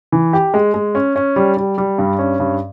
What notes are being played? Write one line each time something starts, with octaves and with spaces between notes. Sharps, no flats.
E3
G4
G#3
G#3
C#4
C#4
G3
G3
G3
G2
C#4
G2